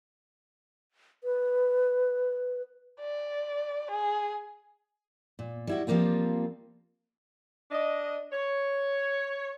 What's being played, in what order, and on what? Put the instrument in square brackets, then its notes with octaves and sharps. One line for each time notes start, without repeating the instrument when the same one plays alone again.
[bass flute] B4
[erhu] D5
G#4
[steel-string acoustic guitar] A#2
G3 E4 F#4
F3 G3 A#3 C4 F4
[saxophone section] D4 D#5
C#5